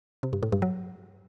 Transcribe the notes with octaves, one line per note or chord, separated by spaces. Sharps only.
C3
G2
A2
G2
F#3